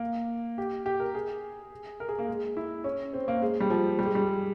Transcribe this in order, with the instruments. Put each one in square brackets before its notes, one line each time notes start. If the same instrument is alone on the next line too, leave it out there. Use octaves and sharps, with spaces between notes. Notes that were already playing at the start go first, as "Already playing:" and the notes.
Already playing: [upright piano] A#3
G4
G4
A#4
G#4
A#4
G#4
A#3
G#3
E4
C#4
C4
A#3
G#3
G3
F3
G3
G#3
G3
G#3